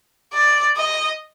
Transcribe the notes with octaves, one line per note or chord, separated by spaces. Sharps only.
D5
D#5